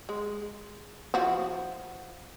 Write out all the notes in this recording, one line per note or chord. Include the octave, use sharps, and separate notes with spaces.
G#3
F3 E4 F#4